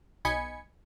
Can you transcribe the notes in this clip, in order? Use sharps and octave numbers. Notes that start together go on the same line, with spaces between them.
B1 D#5 G#5 B5 G#6 C#7